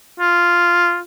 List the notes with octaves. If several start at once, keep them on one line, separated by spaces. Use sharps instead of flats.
F4